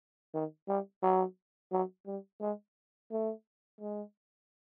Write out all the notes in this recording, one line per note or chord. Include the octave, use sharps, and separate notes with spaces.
D#3
G3
F#3
F#3
G3
G#3
A3
G#3